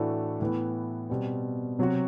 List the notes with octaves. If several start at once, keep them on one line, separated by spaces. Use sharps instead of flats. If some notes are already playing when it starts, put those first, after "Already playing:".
Already playing: A2 E3 A3 D4 F#4
A2 E3 B3
B2 G3 C4
C3 F#3 C4 F#4